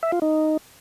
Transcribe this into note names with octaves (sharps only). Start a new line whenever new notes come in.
E5
F4
D#4